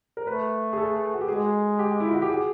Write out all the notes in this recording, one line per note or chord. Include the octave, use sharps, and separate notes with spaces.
A#4
A3 B4
G#4
A4
F#4
G4
G#3 G#4
G4
E4
F4
F#4
G4
G#4